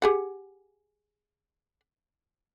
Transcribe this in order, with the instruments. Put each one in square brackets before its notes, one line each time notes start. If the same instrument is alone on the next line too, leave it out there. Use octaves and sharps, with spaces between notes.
[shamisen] G4 G#4 F#5